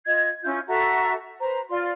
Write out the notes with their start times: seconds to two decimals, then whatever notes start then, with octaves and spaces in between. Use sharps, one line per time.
0.05 F4 D#5 G#6
0.43 C#4 E4 F4 G6
0.66 F#4 A4 E5 A#5
1.40 B4 C5 A#5
1.70 F4 D5 C6